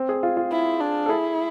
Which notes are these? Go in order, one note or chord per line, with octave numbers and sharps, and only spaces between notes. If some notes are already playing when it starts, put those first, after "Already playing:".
Already playing: C4
G#4
F4
F4
E4
D4
A4
E4 G#4